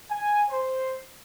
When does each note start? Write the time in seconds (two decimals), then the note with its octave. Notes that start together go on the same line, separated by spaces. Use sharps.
0.11 G#5
0.50 C5